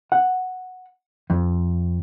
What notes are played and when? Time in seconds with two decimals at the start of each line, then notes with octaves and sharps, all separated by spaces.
0.12 F#5
1.30 F2